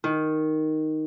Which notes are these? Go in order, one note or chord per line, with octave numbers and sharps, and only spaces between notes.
D#3